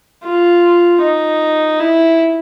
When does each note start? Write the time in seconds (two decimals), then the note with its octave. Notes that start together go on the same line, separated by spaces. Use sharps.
0.24 F4
1.01 D#4
1.80 E4